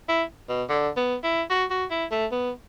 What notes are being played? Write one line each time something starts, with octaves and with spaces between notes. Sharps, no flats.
E4
B2
D3
B3
E4
F#4
F#4
E4
A3
B3